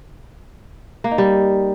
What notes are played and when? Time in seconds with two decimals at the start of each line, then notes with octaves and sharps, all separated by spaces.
1.04 A#3
1.11 D#4
1.18 G3